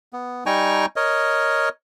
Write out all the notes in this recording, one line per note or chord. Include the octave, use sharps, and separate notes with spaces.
B3
G3 D#4 G5 G#5 A#5 C#6
A#4 C#5 D#5